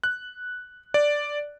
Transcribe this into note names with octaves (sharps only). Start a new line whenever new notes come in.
F#6
D5